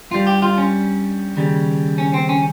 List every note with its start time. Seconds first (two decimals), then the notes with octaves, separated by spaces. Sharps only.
0.11 G2 G3 F4
0.27 G4
0.42 F4
0.58 C#4
1.36 D#2 C#3 G3
1.98 C#4
2.14 C4
2.29 C#4